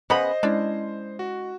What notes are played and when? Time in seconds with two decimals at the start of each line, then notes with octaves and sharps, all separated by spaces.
0.10 C#3 B3 C5 D#5 B5
0.43 G#3 C#4 D4 E4
1.19 F#4